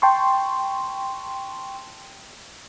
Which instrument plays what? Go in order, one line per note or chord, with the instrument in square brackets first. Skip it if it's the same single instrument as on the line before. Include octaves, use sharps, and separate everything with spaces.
[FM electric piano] G5 A5 C6 C#6